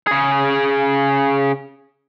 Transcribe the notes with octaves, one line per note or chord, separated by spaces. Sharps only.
C#3 G#4